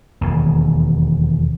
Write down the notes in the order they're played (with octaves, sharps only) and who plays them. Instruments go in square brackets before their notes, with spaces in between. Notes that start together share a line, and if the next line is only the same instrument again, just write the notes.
[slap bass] E1 D#2